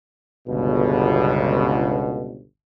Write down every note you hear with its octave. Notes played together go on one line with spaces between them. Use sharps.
G1 C#2 B2